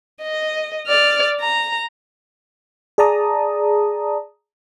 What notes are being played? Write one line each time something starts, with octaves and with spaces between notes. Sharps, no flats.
D#5
D5 F6
A#5
G#4 D5 A5 A#5 D#6